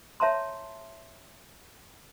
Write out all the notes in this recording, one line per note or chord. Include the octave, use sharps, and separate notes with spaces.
C#5 E5 A5 A#5 C6